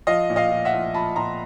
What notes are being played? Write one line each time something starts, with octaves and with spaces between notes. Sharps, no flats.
F3 D#5 F5
A#2
D#5 F5
F3
E5 F#5
F3
F3 A5 B5
A#2 A#5 C6